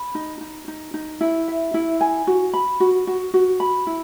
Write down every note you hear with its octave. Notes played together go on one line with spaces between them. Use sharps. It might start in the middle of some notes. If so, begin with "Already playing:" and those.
Already playing: B5
D#4
D#4
D#4
D#4
E4
E5
E4
G#5
F#4
B5
F#4
F#4
F#4
B5
E4